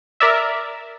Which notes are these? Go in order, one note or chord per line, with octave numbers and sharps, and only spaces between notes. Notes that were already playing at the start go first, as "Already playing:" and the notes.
A#4 D5 E5